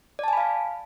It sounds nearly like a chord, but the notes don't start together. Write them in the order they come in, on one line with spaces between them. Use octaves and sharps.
D5 A5 G#5 B5 F5